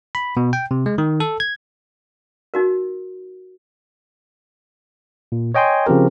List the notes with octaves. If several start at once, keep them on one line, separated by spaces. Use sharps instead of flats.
B5
B2
G5
C3
G#3
D#3
A4
G#6
D#4 F#4 A#4
A#2
C#5 D#5 G5 G#5 C6
C#3 F3 C4 G4 A#4